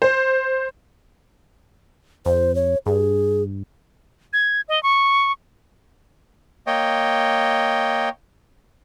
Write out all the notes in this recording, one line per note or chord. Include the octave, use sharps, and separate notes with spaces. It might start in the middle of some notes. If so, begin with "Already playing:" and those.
C5
F2 C5
C#5
G2 G#4
G#6
D#5
C#6
A#3 C#5 D#5 G5